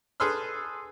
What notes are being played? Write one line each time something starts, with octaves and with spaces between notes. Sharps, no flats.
G#4 A4 B4 C6 E6 F6